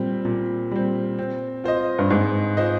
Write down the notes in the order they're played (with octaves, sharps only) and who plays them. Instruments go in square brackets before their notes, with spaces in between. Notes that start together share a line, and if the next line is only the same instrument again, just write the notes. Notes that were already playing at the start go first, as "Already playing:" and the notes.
Already playing: [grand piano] A#2 G3 C4
A#2
G3 C4
C4
F4 C5 D#5
[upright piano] G2
[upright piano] G#2 [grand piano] C4
[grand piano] F4 C5 D#5